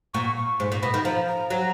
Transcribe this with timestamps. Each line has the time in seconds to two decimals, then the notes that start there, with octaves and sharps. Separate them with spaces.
0.14 A#2 C#6
0.37 C#6
0.60 G#2
0.72 A#2
0.82 B2 B5
0.94 D#3
1.05 F3 A#5
1.28 A#5
1.50 F#3